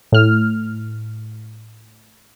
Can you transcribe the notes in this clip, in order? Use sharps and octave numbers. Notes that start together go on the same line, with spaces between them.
A2 F6